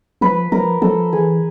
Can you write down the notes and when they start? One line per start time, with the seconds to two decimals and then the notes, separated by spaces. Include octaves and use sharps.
0.21 F3 B4
0.52 F3 A#4
0.82 F3 A4
1.13 E3 G#4